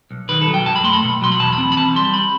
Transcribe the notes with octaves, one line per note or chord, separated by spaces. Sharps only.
B1
D#3 B4
A4
F#3
G5
F#2 A5
B5
A3 C6
B5
B2
F#3 C6
B5
E2 A5
B5
C4
B5
E3 A5
G3 C6
B5